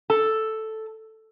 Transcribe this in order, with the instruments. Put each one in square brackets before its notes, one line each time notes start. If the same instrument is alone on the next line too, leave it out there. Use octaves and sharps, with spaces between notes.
[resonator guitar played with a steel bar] A4